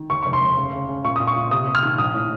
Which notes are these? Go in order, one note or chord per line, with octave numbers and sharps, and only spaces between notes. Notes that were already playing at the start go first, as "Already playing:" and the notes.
Already playing: D#3
D#2 C#6
F1 C#6
C6
F1
C#3
C#3
C#3
A#2 C#6
D#6
A#2
C#6
A#2
C3 D#6
C3
F6
D#3
A#1 D#6
A2